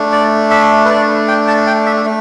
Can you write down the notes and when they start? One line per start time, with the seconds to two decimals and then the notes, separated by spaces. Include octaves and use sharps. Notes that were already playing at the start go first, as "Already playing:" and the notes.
Already playing: A3 D4
0.12 D5
0.51 E5
0.85 B4
0.90 D5
1.28 G5
1.47 A5
1.67 G5
1.86 E5
2.05 A3